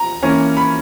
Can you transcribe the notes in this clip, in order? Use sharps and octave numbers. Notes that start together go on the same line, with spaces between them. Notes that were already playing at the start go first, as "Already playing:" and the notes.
Already playing: A#5
E3 A#3 C#4
B5